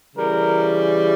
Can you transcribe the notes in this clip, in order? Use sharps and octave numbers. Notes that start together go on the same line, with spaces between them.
C#3 E3 G3 A#4